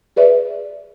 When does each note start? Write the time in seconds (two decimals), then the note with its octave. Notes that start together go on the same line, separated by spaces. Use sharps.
0.16 G#4 B4 D5 E5